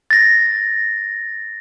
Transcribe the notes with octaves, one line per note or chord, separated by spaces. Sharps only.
A6 A#6